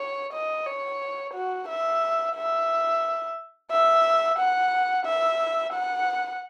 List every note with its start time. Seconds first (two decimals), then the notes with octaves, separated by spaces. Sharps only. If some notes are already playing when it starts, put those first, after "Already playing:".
Already playing: C#5
0.33 D#5
0.66 C#5
1.34 F#4
1.69 E5
2.36 E5
3.71 E5
4.39 F#5
5.06 E5
5.73 F#5